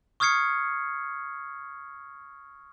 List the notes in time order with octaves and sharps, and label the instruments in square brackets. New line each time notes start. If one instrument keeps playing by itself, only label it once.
[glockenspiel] C#6 D#6 F6 G#6 C7 C#7